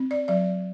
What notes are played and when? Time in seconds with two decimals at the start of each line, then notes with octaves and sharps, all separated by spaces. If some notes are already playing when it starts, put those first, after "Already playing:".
Already playing: C4
0.11 D5
0.28 F#3 D5